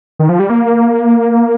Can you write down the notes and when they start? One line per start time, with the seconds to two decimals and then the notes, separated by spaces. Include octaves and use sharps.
0.19 D#3
0.29 F3
0.39 G3
0.50 A#3